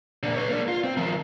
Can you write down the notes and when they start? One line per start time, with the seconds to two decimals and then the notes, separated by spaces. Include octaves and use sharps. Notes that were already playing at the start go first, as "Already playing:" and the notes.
0.23 A#2 D3
0.36 B4 C#5
0.49 A#3 D4
0.68 F4
0.84 C4
0.97 D#3 F3